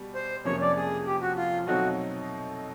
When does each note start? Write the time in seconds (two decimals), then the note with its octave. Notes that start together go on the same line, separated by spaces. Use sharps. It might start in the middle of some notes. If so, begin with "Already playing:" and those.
Already playing: B2 G3 B3
0.15 C5
0.45 F2 C3 F3 A#3 C#4 C#5
0.61 D5
0.76 G#4
1.06 G4
1.22 F#4
1.37 F4
1.67 B2 F#3 A3 C4 D#4 F#4